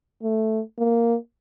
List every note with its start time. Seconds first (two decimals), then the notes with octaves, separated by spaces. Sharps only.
0.23 A3
0.78 A#3